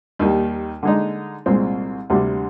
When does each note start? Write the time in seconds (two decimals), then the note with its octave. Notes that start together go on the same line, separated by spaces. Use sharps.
0.19 D#2 D#3 G3
0.83 D3 G#3 D#4
1.46 C2 A#2 G#3 C4
2.10 D2 C3 G3 D4